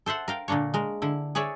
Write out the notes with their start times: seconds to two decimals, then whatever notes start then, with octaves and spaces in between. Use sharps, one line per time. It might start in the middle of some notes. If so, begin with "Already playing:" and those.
0.06 A4 C5 E5 F#5
0.28 A#4 F5 G5
0.48 A#2 D3 A#3 D4 C#5
0.74 G#3 A#4
1.02 D3 E4
1.35 G#4 B4 C#5 D5 E5